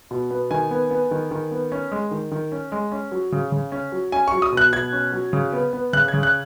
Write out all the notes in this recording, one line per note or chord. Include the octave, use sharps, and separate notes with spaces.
B2
B3
D#3 G#5
B3
B3
D#3
D#3
B3
C#4
G#3
D#3
D#3
C#4
G#3
C#4
F#3
C#3
C#3
C#4
F#3
C#4 G#5
C#6
F#3
D#6
B2
F#6
B2 G#6
C#4
F#3
C#3
B3
B3
C#3 F#6
G#6
C#3
F#6